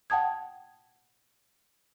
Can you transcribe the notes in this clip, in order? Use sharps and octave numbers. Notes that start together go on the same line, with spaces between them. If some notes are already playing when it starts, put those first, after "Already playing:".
F#5 G5 A5 D#6 G#6